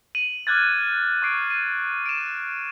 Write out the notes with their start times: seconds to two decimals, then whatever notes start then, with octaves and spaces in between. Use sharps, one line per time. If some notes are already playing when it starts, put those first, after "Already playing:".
0.15 D#7 F#7
0.47 D6 F6 F#6 G#6 A6
1.22 C#6 D6 C7 D7
1.50 D#7
2.06 D7 E7